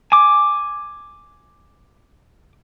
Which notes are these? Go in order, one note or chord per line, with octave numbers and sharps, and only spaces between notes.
G#5 D6